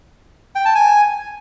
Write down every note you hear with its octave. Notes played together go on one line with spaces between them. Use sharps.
G5
A5
G#5